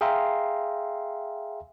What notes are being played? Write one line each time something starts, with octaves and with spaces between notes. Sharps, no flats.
G#4 E5 F5 G5 A#5 C6